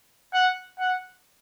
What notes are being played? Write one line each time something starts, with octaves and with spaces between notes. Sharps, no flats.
F#5
F#5